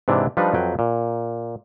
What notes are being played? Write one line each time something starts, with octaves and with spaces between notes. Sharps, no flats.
G#2 C3 E3 D4 G4
F3 G3 D4 D#4 B4
F2 F#3 B4 G5
A#2